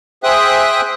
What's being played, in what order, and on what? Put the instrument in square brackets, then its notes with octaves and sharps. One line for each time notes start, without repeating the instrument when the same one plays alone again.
[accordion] G#4 C5 E5 G5 D#6 F#6